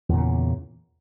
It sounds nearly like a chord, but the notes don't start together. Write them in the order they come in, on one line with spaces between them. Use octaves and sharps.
E2 A#2 C#3